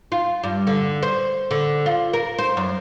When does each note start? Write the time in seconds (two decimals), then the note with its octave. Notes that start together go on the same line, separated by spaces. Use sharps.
0.12 F4
0.44 G2
0.67 D3
1.02 C5
1.51 D3
1.86 F4
2.13 A#4
2.38 C5
2.57 F#2